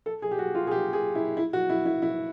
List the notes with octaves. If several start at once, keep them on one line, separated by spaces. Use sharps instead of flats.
A4
G#4
G4
F#4
F4
G#4
G4
G#4
E4
E4
F#4
E4
E4
E4